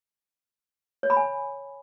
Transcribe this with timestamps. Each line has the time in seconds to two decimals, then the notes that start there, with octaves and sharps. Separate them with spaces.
1.03 C#5
1.10 B5
1.17 G#5